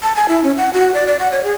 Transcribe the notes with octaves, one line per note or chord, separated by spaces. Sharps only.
A5
G#5
E4
C#4
F#5
F#4
D5
D5
F#5
C#5
G#4